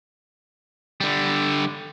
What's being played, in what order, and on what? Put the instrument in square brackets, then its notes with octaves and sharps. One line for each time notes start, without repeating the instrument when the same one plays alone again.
[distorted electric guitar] D3 G3